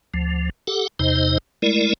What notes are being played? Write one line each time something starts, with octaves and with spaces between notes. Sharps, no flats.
D2 F3
G4 A4 F#5
E2 C3 D#4 C5 D#5
G#3 A3 E4 A#4 D5